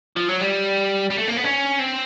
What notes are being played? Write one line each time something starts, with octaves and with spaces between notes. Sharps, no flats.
F3
F#3
G3
G3
A3
A#3
B3
C#4
C4